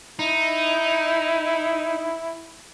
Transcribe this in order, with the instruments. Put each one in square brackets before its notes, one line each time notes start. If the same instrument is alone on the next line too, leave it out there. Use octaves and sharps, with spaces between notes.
[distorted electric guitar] D#4 [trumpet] E4